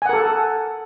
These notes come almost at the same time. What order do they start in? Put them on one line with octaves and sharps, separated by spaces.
G#5 F#5 A#4 A4